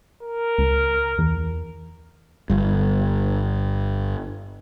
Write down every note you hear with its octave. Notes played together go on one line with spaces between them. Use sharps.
A#4
C#2
E2
G1 G2